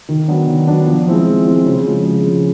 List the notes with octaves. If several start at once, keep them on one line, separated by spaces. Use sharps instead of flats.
D#3
F#3 B3 D4
D#3
F#3 B3 D4
F3
G#3 C4 E4
F3
G#3 C4 E4
C#3
F3 G#3
C#3
F3 G#3